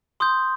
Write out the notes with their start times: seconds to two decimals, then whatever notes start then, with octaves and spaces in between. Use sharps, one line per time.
0.20 C6 D#6 G6